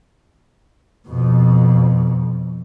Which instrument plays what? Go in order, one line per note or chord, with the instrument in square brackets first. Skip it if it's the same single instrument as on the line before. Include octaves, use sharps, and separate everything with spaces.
[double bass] F2 B2